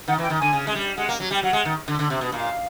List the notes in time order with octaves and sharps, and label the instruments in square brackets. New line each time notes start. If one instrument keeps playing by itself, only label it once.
[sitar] D#3 [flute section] F#5
[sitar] E3
[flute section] G5
[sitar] D#3
[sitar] D3 [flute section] G#5
[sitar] C#3
G#3
G3
[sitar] G#3 [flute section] F#5
[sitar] A#3
F#3
G3
[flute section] G5
[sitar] F#3 [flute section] F#5
[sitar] G#3
D#3
D3
D3
C3
B2
[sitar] A#2 [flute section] F5